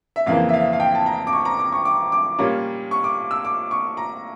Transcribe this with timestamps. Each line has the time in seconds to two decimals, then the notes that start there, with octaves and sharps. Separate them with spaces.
0.16 E5
0.26 F2 C#3 E3 A#3 F5
0.49 E5
0.54 F5
0.73 F5
0.80 G5
0.95 A5
1.06 A#5
1.27 D6
1.33 C#6
1.45 A#5
1.59 D6
1.72 C#6
1.85 D6
2.12 D6
2.39 A#2 G3 A#3 C#4
2.91 C#6
3.04 D6
3.31 E6
3.45 D6
3.71 C#6
3.97 A#5